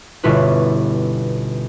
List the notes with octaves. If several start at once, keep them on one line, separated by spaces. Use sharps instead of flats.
G1 B2 C#4 E4 F4 B4